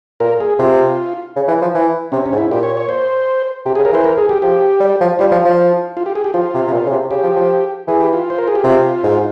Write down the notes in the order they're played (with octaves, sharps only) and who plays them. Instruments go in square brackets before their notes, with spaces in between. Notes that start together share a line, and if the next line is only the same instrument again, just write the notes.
[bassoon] A#2 [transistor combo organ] A#4
[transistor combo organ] G#4
[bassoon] C3 [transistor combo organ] F4
[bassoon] C#3
E3
F3
E3
[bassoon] C3 [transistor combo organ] C#4
[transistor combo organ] C#4
[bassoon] G#2
[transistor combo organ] E4
[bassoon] A#2 [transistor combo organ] G4
[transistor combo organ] C#5
C#5
C5
[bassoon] C3 [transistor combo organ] G4
[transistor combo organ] G#4
[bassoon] C#3
[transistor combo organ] A#4
[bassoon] E3 [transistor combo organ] C5
[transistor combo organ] A#4
G#4
G4
[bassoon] F3 [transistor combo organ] G4
[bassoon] G3
F3
[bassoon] G3 [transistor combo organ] F4
[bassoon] F3
F3
[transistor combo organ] F4
G4
G#4
G4
[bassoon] F3 [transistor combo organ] F4
[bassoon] C3
C3
A#2
C#3
C3
[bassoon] C#3 [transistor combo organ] G4
[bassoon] F3
F3
[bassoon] E3 [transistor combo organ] G#4
[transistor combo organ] G4
F4
C5
A#4
G#4
G4
[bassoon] C3 [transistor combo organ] F4
[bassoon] G#2